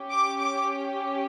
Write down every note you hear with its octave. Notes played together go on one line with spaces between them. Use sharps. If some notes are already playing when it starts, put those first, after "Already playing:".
Already playing: C#4 G4
D6
D6